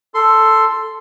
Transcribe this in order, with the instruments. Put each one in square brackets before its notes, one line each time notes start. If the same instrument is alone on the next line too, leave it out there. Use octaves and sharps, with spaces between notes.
[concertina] A4 C6